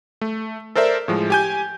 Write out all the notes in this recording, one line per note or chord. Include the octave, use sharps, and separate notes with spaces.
A3
A4 A#4 C5 D5 E5
A2 F3 G#3
G4 G#5 G6